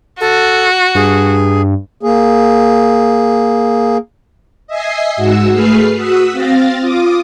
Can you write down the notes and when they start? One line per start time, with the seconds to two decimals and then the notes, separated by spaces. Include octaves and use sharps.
0.20 F#4 A4
0.95 G2 G#4
2.03 A#3 G#4
4.67 D#5 E5 G#5 C7
5.16 G#2 F#4 F#5 E6
5.51 A3 G#4 B4 F6 C7
5.96 F#4 D#6 E6 F#6 B6
6.32 C4 F5 A6 A#6
6.80 F4 D6 D#6